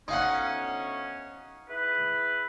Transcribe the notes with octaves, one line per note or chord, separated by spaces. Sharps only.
D2 B3 C#4 D#4 F5 F#5
E4 G#4 B4